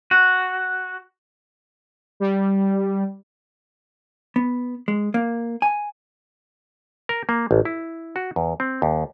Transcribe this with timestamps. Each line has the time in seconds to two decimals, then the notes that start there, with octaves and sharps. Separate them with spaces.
0.11 F#4
2.20 G3
4.36 B3
4.88 G#3
5.14 A#3
5.62 G#5
7.09 A#4
7.29 A#3
7.51 A1
7.65 E4
8.16 F#4
8.36 E2
8.60 C4
8.82 D#2